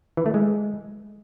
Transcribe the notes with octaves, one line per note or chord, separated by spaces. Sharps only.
E3
A3
G#3